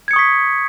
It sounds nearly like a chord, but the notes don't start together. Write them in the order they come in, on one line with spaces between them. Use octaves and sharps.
G#6 C#7 D#6 C#6 B6